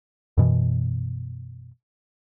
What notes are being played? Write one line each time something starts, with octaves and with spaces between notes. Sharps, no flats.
F#2 B2 E3